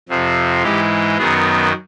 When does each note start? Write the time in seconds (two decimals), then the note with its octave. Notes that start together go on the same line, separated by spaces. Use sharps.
0.09 F2 C3 F3
0.63 G#2 E3 G#3 G4
1.18 F#2 D#3 F#3 B3 G#4